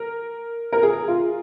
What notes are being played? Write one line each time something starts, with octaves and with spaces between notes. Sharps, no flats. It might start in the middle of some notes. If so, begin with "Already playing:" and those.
Already playing: A#4
A#4
G#4
F4